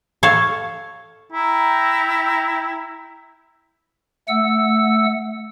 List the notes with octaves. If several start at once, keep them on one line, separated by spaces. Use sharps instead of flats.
A4 C#5 F5
E4 G5 A#5
A3 F#5 E6